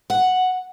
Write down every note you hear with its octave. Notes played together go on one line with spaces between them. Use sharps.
F#5